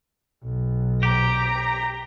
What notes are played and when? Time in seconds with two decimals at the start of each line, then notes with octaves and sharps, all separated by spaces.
0.43 B1
1.03 G4 A#5